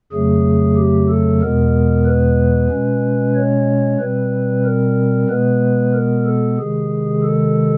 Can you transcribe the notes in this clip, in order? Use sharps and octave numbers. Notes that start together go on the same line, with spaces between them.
F2 C#3 F#3 A3 G#4
G4
A4
E2 B2 G#3 B3 A#4
B4
B2 G#3 C#4
C#5
B2 G3 C4 B4
A#4
B2 G#3 B3 B4
A#4
A4
C3 D#3 G#3 G#4
A4